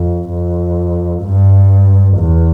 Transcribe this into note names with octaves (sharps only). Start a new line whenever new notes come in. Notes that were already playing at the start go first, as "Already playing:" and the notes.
Already playing: F2
F2
G2
E2